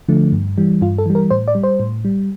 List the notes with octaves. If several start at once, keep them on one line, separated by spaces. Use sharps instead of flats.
D3 F3 A3
G2
E3 G3
G2 F4
A4
E3 G3
A#4
A2 C5
D5
G3
C5
A2
G3